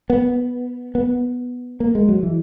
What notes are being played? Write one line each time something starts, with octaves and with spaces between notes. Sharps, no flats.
B3
B3
A#3
G#3
F#3
E3